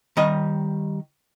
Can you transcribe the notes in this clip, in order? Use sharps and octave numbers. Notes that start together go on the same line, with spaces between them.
D#3 G3 D#5